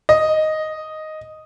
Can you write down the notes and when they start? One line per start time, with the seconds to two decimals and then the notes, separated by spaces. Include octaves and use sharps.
0.09 D#5